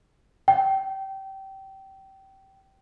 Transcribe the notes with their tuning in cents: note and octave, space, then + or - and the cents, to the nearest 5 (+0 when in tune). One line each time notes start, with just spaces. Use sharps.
G5 -25